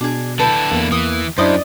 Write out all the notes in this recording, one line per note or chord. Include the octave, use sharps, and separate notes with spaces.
B2 D4 G#4
D3 E4 A4 B4 G5
E2 A#3
E3 D#6
F#2 D4 E4 C5 D5 D#5 D#6